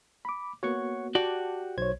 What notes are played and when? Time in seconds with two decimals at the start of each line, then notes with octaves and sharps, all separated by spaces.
0.25 B5 D6
0.63 A#3 B3 F#4 C#5 F#5 C#6
1.15 F#4 G4 D5 F#5 G5 A5
1.78 B1 C5 C#5 G#6